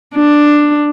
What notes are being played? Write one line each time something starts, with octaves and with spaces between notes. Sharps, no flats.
D4